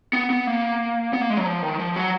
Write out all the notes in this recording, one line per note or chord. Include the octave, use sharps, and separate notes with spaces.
B3
B3
A#3
B3
A#3
G#3
F#3
F3
D#3
F3
F#3